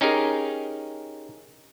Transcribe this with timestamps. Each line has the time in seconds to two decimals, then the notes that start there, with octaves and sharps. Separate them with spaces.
0.01 C#4 D#4 G4 G#4 A#4